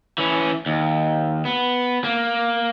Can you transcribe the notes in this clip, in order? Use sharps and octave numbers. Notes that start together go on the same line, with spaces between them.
E3 C#4
D#2
B3
A#3